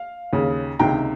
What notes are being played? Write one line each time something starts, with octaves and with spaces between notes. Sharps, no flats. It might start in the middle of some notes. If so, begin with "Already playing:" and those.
Already playing: F5
D#2 C#3
C#2 C3 D#3 G5 A#5